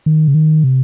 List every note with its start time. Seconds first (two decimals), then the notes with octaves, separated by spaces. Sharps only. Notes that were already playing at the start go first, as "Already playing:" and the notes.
0.06 D#3
0.28 C#3
0.34 D#3
0.64 C3